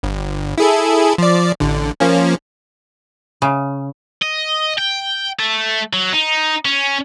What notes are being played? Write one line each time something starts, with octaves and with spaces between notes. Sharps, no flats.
G1
E4 G#4 A4
F3 D5
A1 D3
F3 A#3 C#4
C#3
D#5
G5
A3
F#3
D#4
C#4